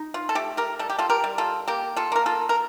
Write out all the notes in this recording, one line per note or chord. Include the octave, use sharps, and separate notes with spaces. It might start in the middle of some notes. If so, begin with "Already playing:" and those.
Already playing: D#4
F4
A4
A3 G4
G4 A#4
G3 A4
G4
F4 A4
G4 A#4
G3
F4 A4
A#3 G4
F4 A4
A#3 A#4
F4 A4
A#4